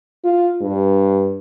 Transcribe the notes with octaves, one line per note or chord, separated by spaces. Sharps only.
F4
G2